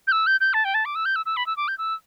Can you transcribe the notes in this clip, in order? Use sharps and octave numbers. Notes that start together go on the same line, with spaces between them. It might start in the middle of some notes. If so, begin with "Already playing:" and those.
G6
E6
G6
G6
A5
G5
A5
D6
E6
G6
E6
E6
B5
E6
D6
G6
E6